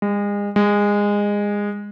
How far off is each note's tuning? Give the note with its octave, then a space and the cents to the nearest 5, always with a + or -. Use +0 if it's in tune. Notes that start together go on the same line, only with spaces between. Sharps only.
G#3 -35
G#3 -20